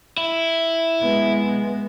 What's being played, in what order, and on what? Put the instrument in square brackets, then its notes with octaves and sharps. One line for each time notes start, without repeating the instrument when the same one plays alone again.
[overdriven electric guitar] E4
[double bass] G#3 B3